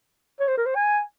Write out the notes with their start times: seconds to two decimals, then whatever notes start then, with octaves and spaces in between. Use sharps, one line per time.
0.40 C#5
0.48 C5
0.57 A#4
0.66 C5
0.76 G#5